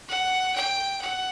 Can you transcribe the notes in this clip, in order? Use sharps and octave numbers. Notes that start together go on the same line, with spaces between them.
F#5
G5
F#5